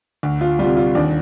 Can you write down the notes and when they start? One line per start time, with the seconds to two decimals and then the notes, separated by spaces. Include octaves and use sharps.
0.23 D2
0.41 F4
0.59 G3 F4
0.64 C3
0.77 F4
0.95 D#2 D4